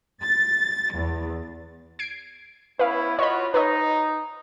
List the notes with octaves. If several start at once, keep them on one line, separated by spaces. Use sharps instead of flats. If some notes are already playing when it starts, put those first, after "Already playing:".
A6
E2
G#6 C7 D7
B3 C#4 E4 B4 F5
F4 F#4 C#5 D#5 B5
D#4 B4 C#5 D#5